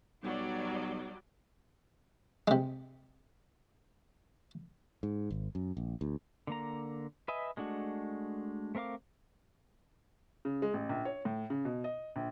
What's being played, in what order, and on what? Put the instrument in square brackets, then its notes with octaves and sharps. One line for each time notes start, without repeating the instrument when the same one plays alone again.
[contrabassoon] B1 [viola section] F#3 G3 D5
[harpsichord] C3 G#3
[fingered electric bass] G#2
G#1
F#2
A#1
D2
[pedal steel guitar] D3 A#3 A#5
B4 D#5 E5 G#5
G#3 A3 D4 F#4
A3 C4 A#4 F5 D6
[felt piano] C#3
G#3
A1
A#1
C#5
A2
C#3
B2
D#5
A#1